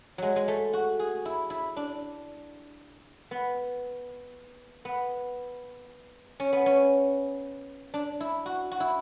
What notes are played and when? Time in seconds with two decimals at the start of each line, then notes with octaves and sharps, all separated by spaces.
0.18 F#3 G#3
0.36 G#3
0.48 A3
0.73 F#4
0.99 G#4
1.25 E4
1.50 E4
1.76 D4
3.31 B3
4.85 B3
6.40 C#4
6.53 B3
6.66 C#4
7.94 D4
8.20 E4
8.46 F#4
8.72 F#4
8.80 E4